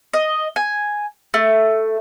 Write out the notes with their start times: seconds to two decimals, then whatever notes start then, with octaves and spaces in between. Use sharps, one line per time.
0.13 D#5
0.56 G#5
1.34 A3